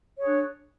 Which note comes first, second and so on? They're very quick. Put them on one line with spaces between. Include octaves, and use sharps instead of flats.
C#5 G#4 D4